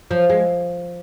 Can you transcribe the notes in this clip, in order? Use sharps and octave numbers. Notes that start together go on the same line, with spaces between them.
F3
G#3